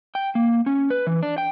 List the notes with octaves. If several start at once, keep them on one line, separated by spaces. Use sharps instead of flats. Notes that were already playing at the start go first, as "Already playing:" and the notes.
G5
A#3
C#4
B4
E3
D4
G5